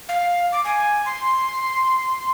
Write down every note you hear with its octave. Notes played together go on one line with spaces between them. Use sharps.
F5
D6
G#5
C6